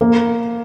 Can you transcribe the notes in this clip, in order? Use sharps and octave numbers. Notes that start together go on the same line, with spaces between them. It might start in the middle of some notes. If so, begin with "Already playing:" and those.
A#3